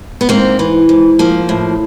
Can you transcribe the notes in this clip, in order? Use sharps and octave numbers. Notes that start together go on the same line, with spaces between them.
B3
G#2 A#3 C4
E3
G#2
F3 A#3
A2